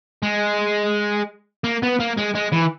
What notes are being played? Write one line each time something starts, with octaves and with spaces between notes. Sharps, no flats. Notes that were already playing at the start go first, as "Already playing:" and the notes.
G#3
A#3
B3
A#3
G#3
G#3
E3